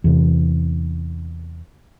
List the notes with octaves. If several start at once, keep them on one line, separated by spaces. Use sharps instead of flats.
E2 C3